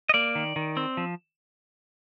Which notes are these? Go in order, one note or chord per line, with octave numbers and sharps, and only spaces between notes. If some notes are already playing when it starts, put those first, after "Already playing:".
D#5
A#3 D5
D#3
D#3
C4
F3